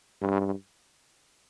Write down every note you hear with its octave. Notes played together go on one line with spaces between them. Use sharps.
G2